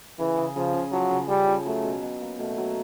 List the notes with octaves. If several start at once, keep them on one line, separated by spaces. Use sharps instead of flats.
C#3 E3
C#3
C#3 F3
C#3
F3 F#3
C#3
C#3 G3
F3
F#3 A3
B2
B2
A#3
B2 A3
F#3